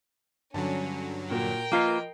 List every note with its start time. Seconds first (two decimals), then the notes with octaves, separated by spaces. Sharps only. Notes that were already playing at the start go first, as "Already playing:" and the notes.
0.54 G2 D3 F#3 C#4 A5
1.30 A#2 A#3 F#4 A#4 G5
1.72 F3 A#3 F4 B4 D#5 C7